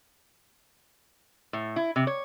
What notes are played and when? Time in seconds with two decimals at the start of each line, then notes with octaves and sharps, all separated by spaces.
1.53 A2
1.76 E4
1.96 C3
2.07 C#5